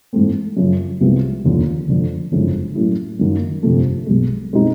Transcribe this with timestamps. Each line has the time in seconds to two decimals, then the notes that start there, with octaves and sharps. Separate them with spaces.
0.13 G#2 E3 A3 C4
0.57 F#2 C#3 F3
1.01 C2 C3 F3 G#3 B3
1.44 F1 D#2 D3 F3
1.88 F1 F2 D3 F3
2.32 G1 F2 C#3 E3 G#3
2.75 A2 F#3 A3 C#4 E4
3.19 F#2 D#3 F#3 A#3
3.63 G1 F2 C3 F3 A3
4.07 B1 B2 G#3
4.52 B2 G#3 C4 D#4